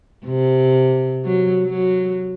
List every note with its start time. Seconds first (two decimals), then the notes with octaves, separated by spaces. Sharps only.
0.25 C3
1.24 F#3
1.64 F#3